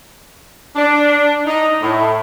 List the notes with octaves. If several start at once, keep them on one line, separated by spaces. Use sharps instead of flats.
D4
D#4
A2